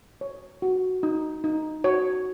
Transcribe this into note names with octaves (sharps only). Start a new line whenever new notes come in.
C#5
F#4
D#4
D#4
F#4 C#5